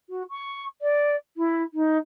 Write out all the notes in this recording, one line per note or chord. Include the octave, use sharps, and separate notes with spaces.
F#4
C#6
D5
E4
D#4